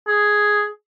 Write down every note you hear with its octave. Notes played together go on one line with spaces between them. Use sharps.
G#4